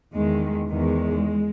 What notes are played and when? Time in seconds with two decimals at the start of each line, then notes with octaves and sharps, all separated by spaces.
0.14 E2 D#3 G#3
0.70 E2 D#3 G#3